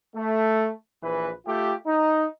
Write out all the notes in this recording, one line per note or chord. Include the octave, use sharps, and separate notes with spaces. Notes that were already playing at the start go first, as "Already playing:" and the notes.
A3
A#1 E3 B4
A3 F4 G4
D#4